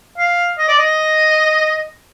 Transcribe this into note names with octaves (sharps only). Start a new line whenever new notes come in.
F5
D#5
D5
D#5